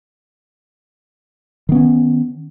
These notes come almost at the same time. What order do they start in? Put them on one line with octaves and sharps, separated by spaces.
D#3 B3 C#4